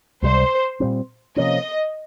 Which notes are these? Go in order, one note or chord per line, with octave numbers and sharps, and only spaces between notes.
C#2 C3 G3 C5
A#2 G3 C4
C3 F3 A#3 C#4 D#5